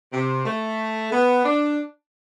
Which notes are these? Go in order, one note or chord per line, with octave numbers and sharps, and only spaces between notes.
C3
A3
B3
D4